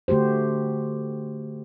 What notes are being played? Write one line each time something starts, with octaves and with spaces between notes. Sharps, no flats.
D3 A3 F#4 G4 C5